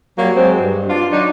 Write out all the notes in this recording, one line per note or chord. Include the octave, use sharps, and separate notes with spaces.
F#3 G3 A#3
F#3 G#3 C4
G2
D4 F4
F#3 D4 D#4